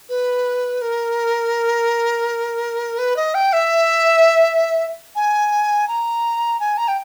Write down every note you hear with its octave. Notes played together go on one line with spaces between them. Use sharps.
B4
A#4
B4
D#5
G5
E5
G#5
A#5
G#5
A#5
G5